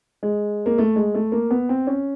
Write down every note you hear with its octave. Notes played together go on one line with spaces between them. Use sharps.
G#3
A#3
A3
G#3
A3
A#3
B3
C4
C#4